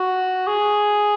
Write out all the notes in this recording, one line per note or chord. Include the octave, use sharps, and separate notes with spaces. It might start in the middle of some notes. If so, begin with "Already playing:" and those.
Already playing: F#4
G#4